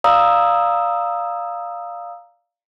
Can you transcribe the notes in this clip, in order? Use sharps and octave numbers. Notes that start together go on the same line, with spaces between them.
D5 F5 A#5 D#6 E6